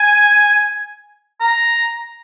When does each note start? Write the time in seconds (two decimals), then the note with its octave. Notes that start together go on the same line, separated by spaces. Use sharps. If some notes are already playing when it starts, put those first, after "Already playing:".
Already playing: G#5
1.40 A#5